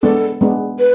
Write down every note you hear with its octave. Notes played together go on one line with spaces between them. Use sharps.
G#3 B3 D4 A4
G#3 B3 D4
B4